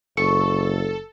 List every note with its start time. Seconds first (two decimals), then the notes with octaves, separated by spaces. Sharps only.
0.17 F#1 A4 C#6